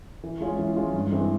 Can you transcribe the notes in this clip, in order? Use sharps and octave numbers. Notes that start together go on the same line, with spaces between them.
E3
G#3 C#4 F4
E3
G#3 C#4 F4
G2
E3 G#3 C4